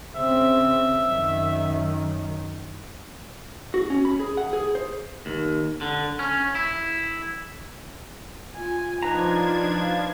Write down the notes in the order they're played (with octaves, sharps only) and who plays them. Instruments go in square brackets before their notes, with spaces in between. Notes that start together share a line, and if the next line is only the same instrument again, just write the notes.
[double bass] C#3 C4 [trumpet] E5
[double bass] F#2 D#3
[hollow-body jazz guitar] F#4
C#4
B5
G#4
F#5
G#4
C5
[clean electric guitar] D#2
D3
C#4
E4
[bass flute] F4 [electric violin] G#5
[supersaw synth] F3 D4 G#6 [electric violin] D#4 [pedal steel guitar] B4 A#5
[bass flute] F5